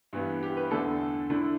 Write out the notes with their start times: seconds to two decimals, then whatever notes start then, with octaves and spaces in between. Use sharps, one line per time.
0.13 G2 E3 B3
0.43 G4
0.57 B4
0.71 E2 D3 A3 D4 A4
1.30 D3 A3 D4 E4